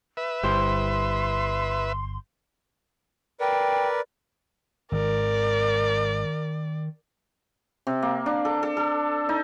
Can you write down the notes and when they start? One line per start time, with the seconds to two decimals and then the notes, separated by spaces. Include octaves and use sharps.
0.17 B4 E5
0.43 G1 G3 E4 C5 C6
3.40 A#4 B4 D5 G5
4.92 G#1 D#3 A#4 D5
7.87 C3
8.03 A#3
8.26 D4
8.45 A4
8.63 A4
8.77 A4
9.29 D#4